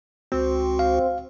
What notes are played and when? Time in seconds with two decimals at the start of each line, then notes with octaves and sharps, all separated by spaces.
0.32 C#2 C4 F#4
0.79 F5